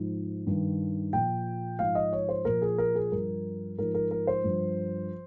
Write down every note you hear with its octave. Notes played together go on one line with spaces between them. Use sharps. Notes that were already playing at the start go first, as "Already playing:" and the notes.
Already playing: G#2 F3
G2 D#3
A#2 F3 G5
G#2 F3 F5
D#5
C#5
C5
A#2 F3 A#4
G#4
A#4
G#4
G2 F3 A#4
G#2 F3 A#4
A#4
A#4
C5
G2 F3